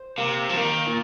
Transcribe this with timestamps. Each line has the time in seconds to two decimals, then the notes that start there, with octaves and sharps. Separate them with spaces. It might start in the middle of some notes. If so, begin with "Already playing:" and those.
Already playing: C5
0.17 C3 A#3
0.49 F3
0.56 D#3 A#3
0.86 A#2